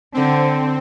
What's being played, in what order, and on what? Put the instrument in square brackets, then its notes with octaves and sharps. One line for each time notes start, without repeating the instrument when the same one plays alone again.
[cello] D3 [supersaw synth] C4